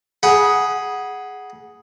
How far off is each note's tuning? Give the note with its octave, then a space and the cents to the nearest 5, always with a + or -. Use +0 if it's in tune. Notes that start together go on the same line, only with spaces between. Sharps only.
G#4 +0 F#5 +5 B5 -30